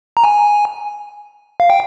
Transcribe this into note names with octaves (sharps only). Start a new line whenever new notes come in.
A#5
G#5
F5
G5